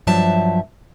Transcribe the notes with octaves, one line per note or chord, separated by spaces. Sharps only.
G2 F3 F#3 E5 A5